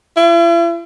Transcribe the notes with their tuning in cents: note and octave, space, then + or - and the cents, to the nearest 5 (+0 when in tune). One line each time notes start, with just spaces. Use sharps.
E4 +45